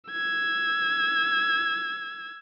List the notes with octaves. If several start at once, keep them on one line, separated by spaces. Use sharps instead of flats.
E6 G#6